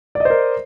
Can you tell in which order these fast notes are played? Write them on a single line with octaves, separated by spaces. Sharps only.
D5 D#5 C5 A#4